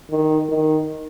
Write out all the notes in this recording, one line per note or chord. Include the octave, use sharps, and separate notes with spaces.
D#3
D#3